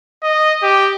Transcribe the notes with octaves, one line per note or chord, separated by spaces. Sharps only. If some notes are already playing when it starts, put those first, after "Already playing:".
D#5
G4